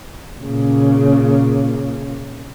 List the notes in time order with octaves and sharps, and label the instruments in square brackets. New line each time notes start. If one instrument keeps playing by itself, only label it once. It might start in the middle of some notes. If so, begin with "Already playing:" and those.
[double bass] A#2 C#3